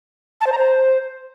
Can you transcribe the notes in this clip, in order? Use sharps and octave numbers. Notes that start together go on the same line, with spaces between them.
A5
C5
A#5
C5